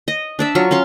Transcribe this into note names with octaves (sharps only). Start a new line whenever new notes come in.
D#5
D4 D5 E5
F#3 F4 C#6
C#4 F5 C6 C#6